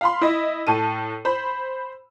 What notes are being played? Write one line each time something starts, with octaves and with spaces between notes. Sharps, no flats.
F5 B5 C6
E4 D#5
A2 A4 D#7
C5 B5